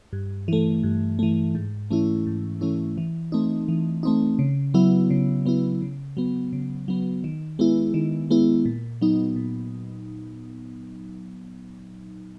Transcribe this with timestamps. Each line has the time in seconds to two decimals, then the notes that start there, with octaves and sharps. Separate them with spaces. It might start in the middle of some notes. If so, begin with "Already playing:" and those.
0.13 G2
0.48 E3 A3
0.83 G2
1.19 E3 A3
1.55 G#2
1.91 E3 A3 C#4 E4
2.26 G#2
2.61 E3 A3 C#4 E4
2.98 E3
3.32 A3 C4 D#4
3.68 E3
4.03 A3 C4 D#4
4.39 C#3
4.74 F#3 B3 E4
5.11 C#3
5.46 F#3 B3 E4
5.82 C#3
6.17 F#3 B3
6.53 C#3
6.88 F#3 B3
7.24 D#3
7.59 G#3 B3 E4
7.94 D#3
8.30 G#3 B3 E4
8.65 A#2
9.02 F#3 B3 D#4
9.36 A#2